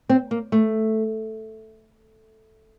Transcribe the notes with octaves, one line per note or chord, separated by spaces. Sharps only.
C4
A#3
A3